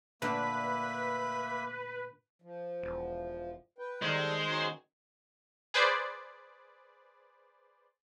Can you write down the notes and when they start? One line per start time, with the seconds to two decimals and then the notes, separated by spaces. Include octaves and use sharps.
0.22 A#2 D3 A3 A#3 B4 E5 B5
2.42 F3
2.82 E1
3.78 B4 G5
4.02 D#3 G3 G#3 A4 C5
4.49 C#4 D#4 F#4
5.74 G#4 B4 C5 D5